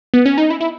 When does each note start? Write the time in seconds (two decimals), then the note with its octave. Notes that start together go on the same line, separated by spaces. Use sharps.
0.14 B3
0.26 C#4
0.38 D#4
0.50 E4
0.61 E4